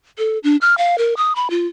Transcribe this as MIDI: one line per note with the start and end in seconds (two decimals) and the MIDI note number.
0.18 0.38 69
0.44 0.57 62
0.61 0.77 89
0.78 0.96 77
0.98 1.14 70
1.17 1.35 87
1.36 1.48 83
1.50 1.67 65